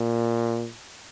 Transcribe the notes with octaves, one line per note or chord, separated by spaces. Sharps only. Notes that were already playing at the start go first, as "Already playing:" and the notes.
Already playing: A#2